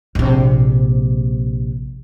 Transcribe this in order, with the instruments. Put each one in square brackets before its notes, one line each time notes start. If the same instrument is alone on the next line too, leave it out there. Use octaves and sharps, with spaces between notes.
[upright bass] A#1 C3